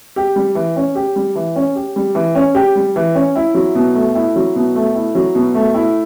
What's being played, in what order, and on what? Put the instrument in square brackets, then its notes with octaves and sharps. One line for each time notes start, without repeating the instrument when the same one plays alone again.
[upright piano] G4
G3
E3
C#4
G4
G3
E3
C#4
G4
G3
E3
C#4
G4
G3
E3
C#4
E4
F#3
B2
A3
E4
F#3
B2
A3
E4
F#3
B2
A3
E4